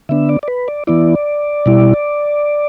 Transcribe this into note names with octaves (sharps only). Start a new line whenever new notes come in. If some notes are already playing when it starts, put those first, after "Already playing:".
D3 B3 D4 E5
D5
D5
B4
D5
E3 B3 E4 D5
B2 G3 E4